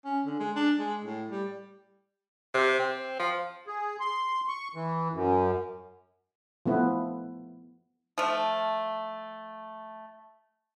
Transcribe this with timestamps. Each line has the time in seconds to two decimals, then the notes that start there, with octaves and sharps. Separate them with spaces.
0.05 C#4
0.26 D3
0.40 G#3
0.56 D4
0.79 G#3
1.04 A2
1.30 G3
2.54 C3
2.79 C4
3.19 F3
3.67 G#4
4.00 C6
4.48 C#6
4.75 E3
5.13 F#2
6.66 F3 A3 B3 E4
8.18 F3 A3